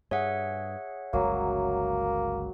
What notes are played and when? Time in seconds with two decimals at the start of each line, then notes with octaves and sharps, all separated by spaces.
0.11 G2 G#4 C#5 E5 F#5
1.13 G1 C#2 C#3 F#3 A#3